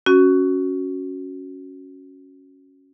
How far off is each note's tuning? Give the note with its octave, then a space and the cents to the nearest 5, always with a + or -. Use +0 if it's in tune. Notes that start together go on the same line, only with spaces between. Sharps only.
C#4 +0 F#4 +0